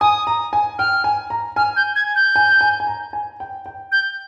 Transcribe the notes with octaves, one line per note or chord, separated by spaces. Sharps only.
G#5 D#6
A#5
G#5
G5 F6
G#5
A#5
G#5 F6
G6
G#6
G6
G#5
G#5
G#5
A#5
G#5
G5
G5
G6